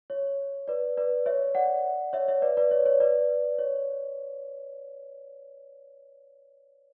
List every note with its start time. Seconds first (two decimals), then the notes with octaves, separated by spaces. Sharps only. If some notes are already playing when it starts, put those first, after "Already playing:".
0.10 C#5
0.68 B4 D5
0.97 B4 D5
1.26 C#5 E5
1.55 D5 F#5
2.13 C#5 E5
2.28 C#5 E5
2.42 B4 D5
2.57 B4 D5
2.71 C#5
2.86 C#5
3.00 B4 D5
3.58 C#5